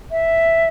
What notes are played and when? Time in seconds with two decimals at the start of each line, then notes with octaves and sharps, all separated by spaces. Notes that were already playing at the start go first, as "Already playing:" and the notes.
0.11 E5